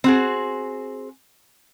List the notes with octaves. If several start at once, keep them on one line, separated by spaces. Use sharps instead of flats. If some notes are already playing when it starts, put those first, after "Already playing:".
C4 F#4 G#4